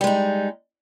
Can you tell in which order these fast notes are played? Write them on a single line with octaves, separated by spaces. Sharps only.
G3 G#3 D#4